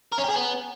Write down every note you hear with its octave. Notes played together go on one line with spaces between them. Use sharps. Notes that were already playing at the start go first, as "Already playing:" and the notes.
A#4
C#4
G4
G#4
B3